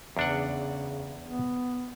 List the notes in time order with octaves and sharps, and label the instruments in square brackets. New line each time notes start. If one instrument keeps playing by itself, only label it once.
[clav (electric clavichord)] E2 D4 F#5 [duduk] C#3
[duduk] B3